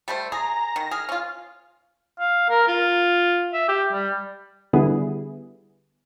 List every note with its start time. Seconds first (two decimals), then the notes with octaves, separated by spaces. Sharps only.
0.08 G3 A3 C5
0.32 G#4 A#5
0.76 D#3 A#6
0.91 G#4 F6
1.09 C#4 F4 F6
2.19 F5
2.49 A#4
2.68 F4
3.53 E5
3.68 G4
3.93 G3
4.73 D3 G3 B3 E4 G#4